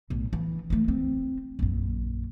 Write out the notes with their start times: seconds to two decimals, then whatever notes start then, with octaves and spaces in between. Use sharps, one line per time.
0.10 B1 A2
0.33 E3
0.70 E3 A3
0.88 C4
1.59 A#1 F#2